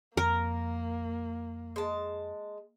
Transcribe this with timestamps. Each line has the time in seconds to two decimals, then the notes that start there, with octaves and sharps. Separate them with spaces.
0.17 F2 A#3 A#4
1.76 G#3 A5